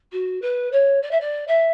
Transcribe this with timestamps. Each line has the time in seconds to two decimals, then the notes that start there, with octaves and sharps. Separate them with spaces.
0.12 F#4
0.42 B4
0.72 C#5
1.02 D5
1.11 E5
1.20 D5
1.47 E5